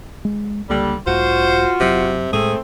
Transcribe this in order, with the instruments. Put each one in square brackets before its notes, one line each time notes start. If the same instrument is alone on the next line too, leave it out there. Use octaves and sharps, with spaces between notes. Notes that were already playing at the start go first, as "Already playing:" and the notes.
[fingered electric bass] G#3
[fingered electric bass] C#2 A#3 [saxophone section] D3 G3
[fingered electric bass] B1 G#2 [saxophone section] F4 F#4 [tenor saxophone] C5
[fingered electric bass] F#1 F#3 [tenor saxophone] C3
[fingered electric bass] A2 G#3 [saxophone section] A3 C4 [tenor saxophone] G#4